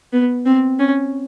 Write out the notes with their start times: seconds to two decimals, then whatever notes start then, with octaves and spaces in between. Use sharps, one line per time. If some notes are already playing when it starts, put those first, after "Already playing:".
0.13 B3
0.46 C4
0.79 C#4